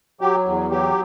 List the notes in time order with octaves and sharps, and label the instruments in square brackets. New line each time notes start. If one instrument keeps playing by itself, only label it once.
[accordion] F#3 G4
E2
F#3 G4